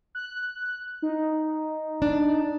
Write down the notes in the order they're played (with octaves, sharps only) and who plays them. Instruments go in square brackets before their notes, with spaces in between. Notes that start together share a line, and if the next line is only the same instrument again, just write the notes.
[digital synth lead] F#6
D#4
[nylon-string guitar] D4